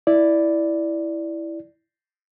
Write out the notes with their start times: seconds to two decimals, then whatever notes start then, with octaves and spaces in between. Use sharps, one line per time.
0.07 E4 D5